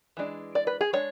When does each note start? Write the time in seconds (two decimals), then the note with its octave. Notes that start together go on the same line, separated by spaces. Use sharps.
0.17 E3 G#3 D4
0.55 D5
0.67 B4
0.81 G#4
0.93 G#3 D4 C#5